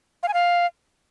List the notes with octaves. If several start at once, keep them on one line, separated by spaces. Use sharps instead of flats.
F5
G#5
F5